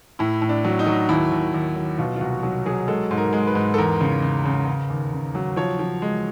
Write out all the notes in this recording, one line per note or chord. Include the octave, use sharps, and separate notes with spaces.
A2 E4
A2
D4
F#3
D#4
F#3
D#2 E4
D#2
D#2
F#3
B2 F4
F4
C2 F#4
F#3
F#3 G#4
G#3 A4
G#2
A#4
G#3
B4
G#2
A4
E2 A#4
C#3
C#3
C#3
C#3
D#2
C#3
F#3
F3 C#5
F3
G#3